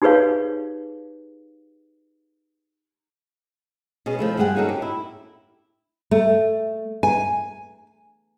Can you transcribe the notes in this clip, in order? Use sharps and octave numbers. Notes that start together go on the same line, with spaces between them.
D#4 G4 G#4 B4 C#5 F5
B2 C#4 G#4
F3 A3 E4
G2 G#3 G4 G#4 F#5 G#5
A#3 C#4 D#4 F#4 G#4 A4
G4
E4
A3
G#5